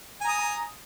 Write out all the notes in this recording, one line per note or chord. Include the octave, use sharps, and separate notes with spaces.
G#5 A#5 D#6